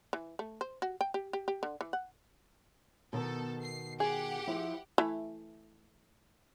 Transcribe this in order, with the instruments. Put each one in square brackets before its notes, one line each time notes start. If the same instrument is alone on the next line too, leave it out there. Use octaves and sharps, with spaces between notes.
[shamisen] E3
A3
C5
F#4
G5
G4
G4
G4
D3
E3
F#5
[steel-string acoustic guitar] B2 D#3 [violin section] A4
[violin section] C7
[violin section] G4 F#5 [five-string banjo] G#4
[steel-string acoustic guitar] F3 E4
[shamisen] E3 A3